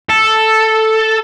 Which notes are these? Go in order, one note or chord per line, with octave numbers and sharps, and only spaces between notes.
A4